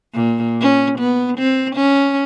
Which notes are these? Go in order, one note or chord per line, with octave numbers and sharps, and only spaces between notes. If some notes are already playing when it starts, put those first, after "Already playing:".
A#2
C#4
B3
C4
C#4